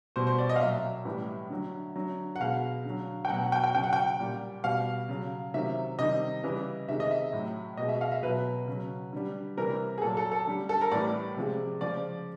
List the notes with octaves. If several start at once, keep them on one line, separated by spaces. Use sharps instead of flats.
B2 G3 C5
C5
D5
D#5
F5
A#2 F#3 E5
A2 E3 G3
D3 F#3
D3 F#3
F#5
B2 G#3 F5
D3 F#3
G5
B2 F#3 F#5
G5
G5
C#3 F#3 G5
F#5
G5
A#2 G3
B2 G3 F5
C#3 F#3
C3 D#3 F#3 E5
C3 D#3 G3 D#5
C#3 E3 G3
C3 D#3 G#3 E5
D#5
E5
A2 F#3
B2 G#3 D#5
E5
F5
E5
B2 F#3 B4
C#3 F#3
D3 G3
C3 E3 G3 A#4
G#4
A#2 F#3 A4
A4
A4
D3 G3
A4
A#4
A2 E3 G3 D5
C3 F3 G#3
C#3 F3 G#3 D5